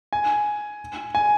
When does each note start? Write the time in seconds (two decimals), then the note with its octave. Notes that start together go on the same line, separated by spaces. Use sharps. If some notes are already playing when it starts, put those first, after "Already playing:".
0.13 G#5
1.15 G#5